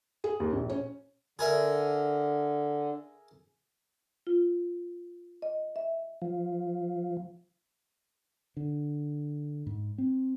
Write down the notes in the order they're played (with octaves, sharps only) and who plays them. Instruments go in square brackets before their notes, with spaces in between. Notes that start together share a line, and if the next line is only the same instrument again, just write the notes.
[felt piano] G#4
D#2
A#1
C#4
[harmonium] D3 [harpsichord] G#4 A#4 E5
[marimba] F4
D#5
E5
[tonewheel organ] F3
[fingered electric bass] D3
G#2
C4